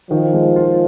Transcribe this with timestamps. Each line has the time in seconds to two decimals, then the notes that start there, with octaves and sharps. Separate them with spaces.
0.10 D#3 F3
0.33 G#3
0.56 F4